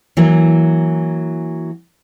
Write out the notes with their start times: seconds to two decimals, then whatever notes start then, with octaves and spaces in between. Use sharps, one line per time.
0.17 E3 F#3 A#3